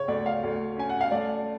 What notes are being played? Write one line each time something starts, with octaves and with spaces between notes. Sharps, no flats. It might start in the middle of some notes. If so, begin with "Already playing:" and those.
Already playing: C#3 C#5
D2 D5
F5
D2
C#4 G#5
F#5
F5
A3 D5